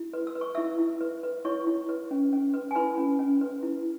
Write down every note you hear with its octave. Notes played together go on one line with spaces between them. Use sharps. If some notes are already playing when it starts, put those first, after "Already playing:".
Already playing: E4
B4
E6
B4
C#6
E4 E5 E6
E4
B4
B4
E4 C#5 C#6
E4
B4
C#4
C#4
B4
G#5
E4 B4 B5
C#4
C#4
B4
E4